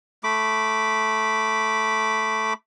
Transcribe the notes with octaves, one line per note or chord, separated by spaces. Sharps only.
A3 B5 D6